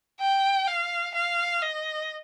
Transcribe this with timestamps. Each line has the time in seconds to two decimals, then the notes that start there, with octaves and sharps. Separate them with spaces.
0.20 G5
0.67 F5
1.15 F5
1.62 D#5